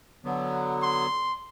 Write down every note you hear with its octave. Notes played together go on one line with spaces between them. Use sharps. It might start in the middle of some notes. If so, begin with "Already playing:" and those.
D3 F#3 B3
C6